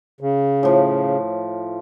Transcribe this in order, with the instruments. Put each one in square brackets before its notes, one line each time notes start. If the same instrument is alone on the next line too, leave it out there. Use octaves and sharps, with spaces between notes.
[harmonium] C#3
[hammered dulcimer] A2 F3